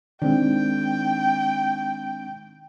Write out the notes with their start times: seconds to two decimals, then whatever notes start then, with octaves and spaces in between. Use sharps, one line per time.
0.22 D#3 G#3 C4 D4 G5